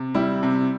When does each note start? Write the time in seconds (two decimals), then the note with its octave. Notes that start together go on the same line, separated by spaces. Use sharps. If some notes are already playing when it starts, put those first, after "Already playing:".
Already playing: C3
0.15 G3 E4
0.43 C3